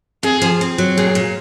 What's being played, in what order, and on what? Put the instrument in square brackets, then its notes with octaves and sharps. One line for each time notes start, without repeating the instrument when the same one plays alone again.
[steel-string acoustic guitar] F2 [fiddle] G#4
[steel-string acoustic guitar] F3
C4
F#3
[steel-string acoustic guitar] A#2 [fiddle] G#4
[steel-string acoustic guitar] A#2